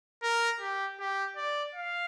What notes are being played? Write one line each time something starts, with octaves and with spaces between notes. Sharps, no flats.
A#4
G4
G4
D5
F5